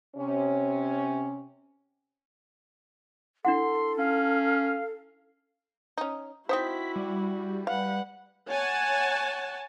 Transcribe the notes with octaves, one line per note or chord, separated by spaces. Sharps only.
C3 C#4
D4 E4 A4 F#5 C6
C#4 F5
C#4 D#4
C4 D#4 E4 F#4 C5 B6
G3
B4 F5 F#5
C#5 F#5 G#5 A5